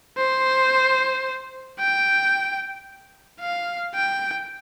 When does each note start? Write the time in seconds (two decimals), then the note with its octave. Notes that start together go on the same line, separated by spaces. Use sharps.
0.17 C5
1.79 G5
3.41 F5
3.95 G5